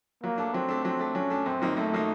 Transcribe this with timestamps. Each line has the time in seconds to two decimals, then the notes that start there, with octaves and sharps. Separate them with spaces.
0.24 F#3 A#3
0.38 A3 D4
0.54 F#3 C4
0.68 A3 D4
0.84 F#3 C4
0.99 A3 D4
1.15 F#3 C#4
1.30 A3 D4
1.46 F#2 C4
1.62 D#3 F#3 A#3 D#4
1.76 F#2 A3
1.93 D#3 F#3 A#3 D#4